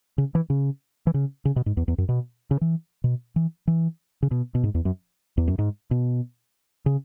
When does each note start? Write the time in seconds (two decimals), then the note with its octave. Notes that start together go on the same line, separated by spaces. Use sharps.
0.18 C#3
0.35 E3
0.50 C#3
1.07 E3
1.14 C#3
1.45 C#3
1.56 B2
1.66 G#2
1.77 E2
1.88 E2
1.98 F#2
2.09 B2
2.51 C#3
2.61 E3
3.04 B2
3.36 E3
3.67 E3
4.22 C#3
4.31 B2
4.55 B2
4.64 G#2
4.74 E2
4.85 F#2
5.37 E2
5.48 F#2
5.58 G#2
5.91 B2
6.86 C#3